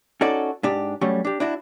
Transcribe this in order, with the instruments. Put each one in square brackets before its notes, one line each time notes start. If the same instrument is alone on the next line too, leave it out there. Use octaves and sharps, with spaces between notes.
[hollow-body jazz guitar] C#4 D#4 F#4 A4 D5
G#2 D4 G4
F#3 G3 A3 C#4
D4 G4
D4 E4 F#4